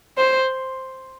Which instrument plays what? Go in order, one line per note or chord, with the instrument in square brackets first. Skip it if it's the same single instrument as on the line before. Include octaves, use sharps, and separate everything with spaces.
[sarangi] C5